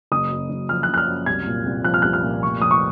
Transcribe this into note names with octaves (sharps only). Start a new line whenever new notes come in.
F#1 D#6
F#2
F#1
F3 F6
F#6
F#1
F#6
F6
F#2
C2 G#6
A#2
C2
F3 F#6
F6
C2 F#6
F6
A#2
F1 C#6
F2 D#6
C#6